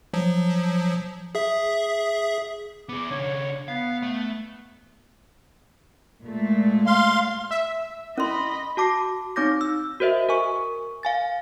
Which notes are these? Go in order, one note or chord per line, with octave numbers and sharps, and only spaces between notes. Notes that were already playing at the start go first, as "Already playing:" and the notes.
F3 F#3
G#4 E5
B3 G#4 D6
C#3 D4 C#5
B3 F5
A3
A#2 G#3 A3
F5 C6
E5
C#4 D#5 B5 C6
F#4 A5 D6 A#6 C7
C4 D#4 C#5 D6 G6 A#6
E6
F#4 A#4 C5 D#5 E5
A#4 G#5 C#6
F5 G#5 A6